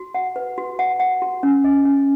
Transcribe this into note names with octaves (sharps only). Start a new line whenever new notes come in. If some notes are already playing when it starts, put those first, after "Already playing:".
Already playing: F#4
F#5
B4
F#4
F#5
F#5
F#4
C#4
D#5
C#4